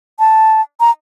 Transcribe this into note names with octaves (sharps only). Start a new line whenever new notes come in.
A5
A#5